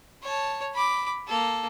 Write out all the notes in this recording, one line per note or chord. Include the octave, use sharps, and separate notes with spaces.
C#5 A5
B5 D6
A#3 A4